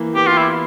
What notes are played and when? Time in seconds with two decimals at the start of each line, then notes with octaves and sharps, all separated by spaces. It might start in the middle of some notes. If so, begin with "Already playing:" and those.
Already playing: E3 A#3
0.16 B3 G4
0.27 F4
0.38 E4